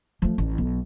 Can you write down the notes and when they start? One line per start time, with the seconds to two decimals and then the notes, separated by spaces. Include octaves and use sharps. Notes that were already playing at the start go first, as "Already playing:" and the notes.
0.22 F3 A3
0.38 A1
0.58 B1